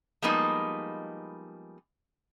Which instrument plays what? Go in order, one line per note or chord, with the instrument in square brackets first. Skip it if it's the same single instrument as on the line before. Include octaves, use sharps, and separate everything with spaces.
[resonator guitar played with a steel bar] F3 G3 G#3 A#3 B3 D#4